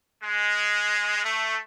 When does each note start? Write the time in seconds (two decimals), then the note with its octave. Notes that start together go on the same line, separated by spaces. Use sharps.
0.22 G#3
1.23 A3